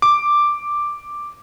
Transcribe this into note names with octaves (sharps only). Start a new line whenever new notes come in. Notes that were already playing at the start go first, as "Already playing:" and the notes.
D6